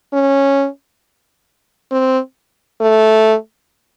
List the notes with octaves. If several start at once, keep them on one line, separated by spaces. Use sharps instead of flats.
C#4
C4
A3